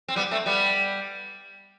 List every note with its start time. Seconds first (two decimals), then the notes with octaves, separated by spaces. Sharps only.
0.08 C4
0.16 G3 B3
0.31 A3 C4
0.46 G3 B3